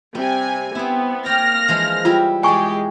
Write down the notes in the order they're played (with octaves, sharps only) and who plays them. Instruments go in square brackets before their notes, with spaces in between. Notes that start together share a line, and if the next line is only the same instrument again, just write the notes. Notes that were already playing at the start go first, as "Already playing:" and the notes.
[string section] C3 G#5 [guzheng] G3
[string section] B3 [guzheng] C4 E4
[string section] A#3 F6 A#6 [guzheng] C#5 D5 G5
[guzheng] E3 F3 G#3
[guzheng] G3 E4 [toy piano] F4
[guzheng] E2 G#4 D5 [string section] G#3 G4 [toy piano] G5 G#5 C#6